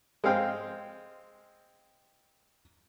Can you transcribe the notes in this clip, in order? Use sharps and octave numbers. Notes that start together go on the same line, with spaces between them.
G#3 C4 F5 G5